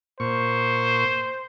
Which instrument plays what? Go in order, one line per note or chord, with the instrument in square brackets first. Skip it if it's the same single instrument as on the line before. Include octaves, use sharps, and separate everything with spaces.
[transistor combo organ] A#2 C#6 [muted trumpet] C5